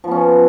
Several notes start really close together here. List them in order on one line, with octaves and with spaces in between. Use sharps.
F3 B3 C#4